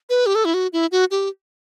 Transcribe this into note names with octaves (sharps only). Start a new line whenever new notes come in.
B4
G4
A4
E4
F#4
E4
F#4
G4